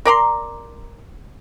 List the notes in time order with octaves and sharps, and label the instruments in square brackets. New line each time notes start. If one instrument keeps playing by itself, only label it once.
[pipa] A#4 D5 A#5 C6